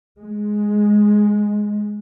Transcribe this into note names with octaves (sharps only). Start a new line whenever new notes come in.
G#3